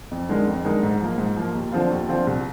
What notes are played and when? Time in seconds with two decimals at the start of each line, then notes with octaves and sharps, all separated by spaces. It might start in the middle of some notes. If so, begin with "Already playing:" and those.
0.11 F2
0.29 D3 G#3 D#4 A#4
0.47 F2
0.65 D3 G#3 D#4 A#4
0.83 G#2
1.00 F3 A#3
1.18 G#2
1.36 F3 A#3
1.55 D#2
1.72 D3 F3 C4 F4
1.90 D#2
2.08 D3 F3 C4 F4
2.27 C2